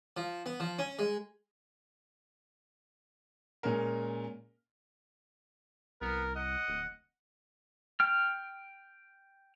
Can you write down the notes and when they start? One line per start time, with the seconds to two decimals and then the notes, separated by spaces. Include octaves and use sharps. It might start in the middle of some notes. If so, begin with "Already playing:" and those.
0.17 F3
0.46 B3
0.60 F3
0.79 C#4
0.99 G#3
3.63 A#2 G#3 C#4 A#4
6.02 C2 B3 A#4
6.35 D#5 F#5
6.68 D1
8.00 G5 F6